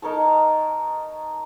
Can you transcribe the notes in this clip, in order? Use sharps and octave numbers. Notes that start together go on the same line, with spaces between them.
D#4 A#4 C#5 A5